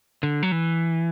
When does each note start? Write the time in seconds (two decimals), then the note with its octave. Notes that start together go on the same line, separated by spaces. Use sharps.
0.23 D3
0.43 F#3
0.52 E3